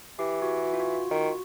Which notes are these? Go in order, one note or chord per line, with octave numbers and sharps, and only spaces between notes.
E3 G4
F#4
F#4
F4
F#4
F4
D#3 F#4